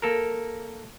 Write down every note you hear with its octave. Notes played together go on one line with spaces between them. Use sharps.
A#3 A4 A#4